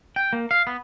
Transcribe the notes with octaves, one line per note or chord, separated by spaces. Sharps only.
G5
A#3
F5
B3